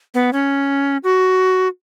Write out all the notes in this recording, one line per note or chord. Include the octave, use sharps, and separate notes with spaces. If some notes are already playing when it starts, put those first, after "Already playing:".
B3
C#4
F#4